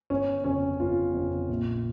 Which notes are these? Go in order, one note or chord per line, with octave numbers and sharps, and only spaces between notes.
G1 C#4
F2 C#3 C#4
G1 F4
F2 C#3
A#1